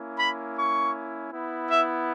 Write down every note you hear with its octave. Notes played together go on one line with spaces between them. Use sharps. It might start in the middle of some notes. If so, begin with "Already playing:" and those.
Already playing: A#3 C#4 E4
B5
C#6
B3 E4
E5